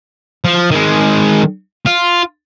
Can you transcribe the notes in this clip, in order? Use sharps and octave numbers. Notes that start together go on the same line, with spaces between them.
F3
D#3 G#3
F4